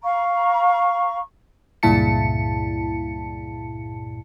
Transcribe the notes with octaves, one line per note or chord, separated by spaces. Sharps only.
F5 A#5 C#6
C#2 G2 A#2 E4 A5 C#7